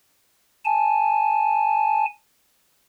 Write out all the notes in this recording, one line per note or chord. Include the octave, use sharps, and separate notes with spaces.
G#5 A5